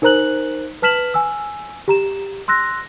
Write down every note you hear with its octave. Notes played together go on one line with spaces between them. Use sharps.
D#4 A#4 C5 A#5 F#6 F#7
B4 A5 F6 B6 E7 F#7
G#5 E6
G4 A#5 E7
C6 E6 F#6 A#6